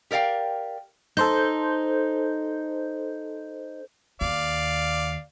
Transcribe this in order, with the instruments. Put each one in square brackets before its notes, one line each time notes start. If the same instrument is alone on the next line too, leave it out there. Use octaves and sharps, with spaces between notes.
[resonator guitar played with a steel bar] G4 A#4 D5 F5 G5
[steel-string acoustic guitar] D#4 [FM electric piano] A4 C5 G6
[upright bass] D#2 [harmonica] D5 F5